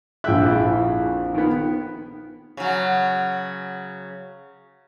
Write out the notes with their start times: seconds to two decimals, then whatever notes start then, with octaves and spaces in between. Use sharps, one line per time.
0.24 A#1 G#4 E5 G5 F#6
0.42 F2 E4
1.34 D#3 B3
2.57 C#3 F#3